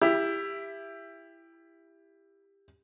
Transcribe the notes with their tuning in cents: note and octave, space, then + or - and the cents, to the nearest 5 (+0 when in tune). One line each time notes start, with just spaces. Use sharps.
E4 +15 G4 +20